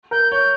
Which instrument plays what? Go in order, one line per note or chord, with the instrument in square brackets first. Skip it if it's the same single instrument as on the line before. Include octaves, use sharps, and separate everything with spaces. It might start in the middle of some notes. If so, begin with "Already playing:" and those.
[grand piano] A#4 [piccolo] G6
[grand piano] C#5 [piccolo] G6